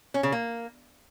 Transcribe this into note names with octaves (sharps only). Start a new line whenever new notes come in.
C#4
C#3
A#3